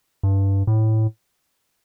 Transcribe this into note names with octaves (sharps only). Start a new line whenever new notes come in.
G2
A2